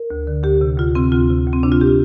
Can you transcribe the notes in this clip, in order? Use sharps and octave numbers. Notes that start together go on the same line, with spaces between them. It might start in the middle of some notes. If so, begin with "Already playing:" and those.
Already playing: A#4
D2
D3
D2 G4
C3
D2 F4
C3 C4
D2 F4
C3
D2
C4
C3 D4
F4
G4